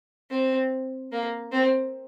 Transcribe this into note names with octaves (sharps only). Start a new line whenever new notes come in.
C4
A#3
C4